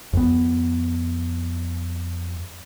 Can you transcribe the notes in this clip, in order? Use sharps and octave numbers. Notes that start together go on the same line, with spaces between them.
F2 B3